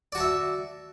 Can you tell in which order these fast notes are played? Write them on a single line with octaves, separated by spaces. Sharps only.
D5 F#4 A5 E5